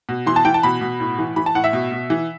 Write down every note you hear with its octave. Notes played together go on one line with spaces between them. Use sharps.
B2
E3 C6
A5
E3 G5
A5
B2 B5
B2
A2
E3
E3 B5
A5
A2 F#5
E5
B2
B2
E3